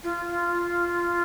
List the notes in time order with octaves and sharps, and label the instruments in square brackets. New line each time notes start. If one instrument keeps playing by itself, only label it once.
[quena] F4